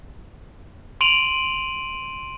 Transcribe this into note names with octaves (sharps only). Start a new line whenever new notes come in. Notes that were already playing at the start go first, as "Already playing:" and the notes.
C6 D7 D#7 F7 F#7